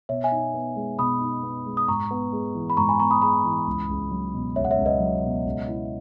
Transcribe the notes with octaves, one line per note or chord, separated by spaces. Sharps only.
B2 C#5 E5
E5 G#5
D#4
B3
G#3
B2 B5 D#6
D#4
B3
G#3
D#6
G#2 A#5 C#6
B3
G#3
E3
B5
G#2 A#5 C#6
G#5 B5
B3 A#5 C#6
B5 D#6
G#3 B5 D#6
E3
C#2
C#2
F#3
B2
C#2 C#5 E5
F#5
C#5 E5
C#2
B4 D#5
F#3
B2
C#2
E4